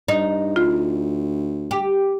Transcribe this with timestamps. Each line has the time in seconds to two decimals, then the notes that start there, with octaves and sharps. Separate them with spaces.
0.08 G2 D#4
0.56 D2 F4
1.71 G4